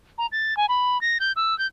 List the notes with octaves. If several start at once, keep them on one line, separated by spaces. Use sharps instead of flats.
A#5
A6
G#5
B5
A#6
G6
E6
G6